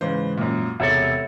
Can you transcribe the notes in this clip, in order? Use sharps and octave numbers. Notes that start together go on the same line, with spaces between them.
G#2 C#3 E3 B4 C5
F#2 A#2
E1 C3 A4 C#5 E5